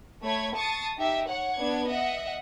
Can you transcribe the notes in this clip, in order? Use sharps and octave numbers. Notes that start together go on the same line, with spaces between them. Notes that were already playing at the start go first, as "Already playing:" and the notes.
A3 C#5 B5 G#6
A5 C#6 D#6 A6 C7
D#4 G4 E5
C#5 F#5
B3 D4 G#6
D#5 E5 F#5